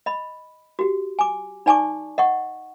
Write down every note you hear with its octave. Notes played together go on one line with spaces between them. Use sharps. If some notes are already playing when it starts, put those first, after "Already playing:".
D#5 B5
F#4 G4
G#5 D6
D#4 D5 G#5 A5 C#6 D6
D#5 F#5 C#6